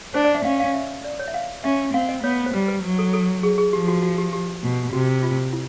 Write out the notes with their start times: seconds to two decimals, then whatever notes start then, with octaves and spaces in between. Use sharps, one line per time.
0.14 D4 C5
0.24 D5
0.35 E5
0.44 C#4 F5
0.60 F5
0.74 E5
1.04 D5
1.19 C#5
1.28 E5
1.34 F5
1.64 C#4 E5
1.94 C4 F5
2.09 D#5
2.23 B3 C#5
2.46 C5
2.53 G3 B4
2.68 B4
2.83 F#3
2.99 A4
3.14 A4
3.43 G#4
3.58 G#4
3.73 F3 G4
3.88 F#4
4.03 F#4
4.18 G4
4.33 G4
4.63 B2
4.92 C3 F#4
5.23 F4
5.53 E4